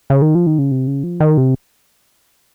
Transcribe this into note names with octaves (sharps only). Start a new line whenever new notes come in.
C#3
D#3
F3
D#3
C#3
C3
C#3
F3
D#3
C3